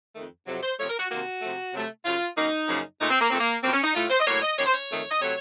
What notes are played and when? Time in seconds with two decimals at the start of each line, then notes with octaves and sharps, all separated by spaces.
0.15 F2 D#3 A3
0.47 F2 C3 F#3
0.62 C5
0.78 C3 F3 A3 C#5
0.89 A#4
0.99 F#4
1.09 C3 D#3 A#3 F#4
1.42 C3 F3 A3
1.73 C3 F#3 A3
2.05 F#2 C#3 F#3 F4
2.36 F#2 D#3 A#3 D#4
2.68 F#2 C#3 F3 A#3
3.00 A#2 A3 D#4
3.10 C4
3.21 A#3
3.30 A#2 F3 A3 C4
3.40 A#3
3.62 F#2 F3 A#3 C4
3.73 C#4
3.84 D#4
3.94 A2 A3 F4
4.10 C5
4.20 D#5
4.27 A2 F#3 A#3 C#5
4.42 D#5
4.57 F#2 D#3 A#3 C#5
4.65 C5
4.74 C#5
4.90 F2 D#3 A3
5.11 D#5
5.21 C3 F#3 A3 C#5